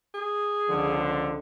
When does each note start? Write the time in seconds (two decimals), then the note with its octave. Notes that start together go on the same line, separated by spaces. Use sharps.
0.14 G#4
0.69 C#2 D3 F3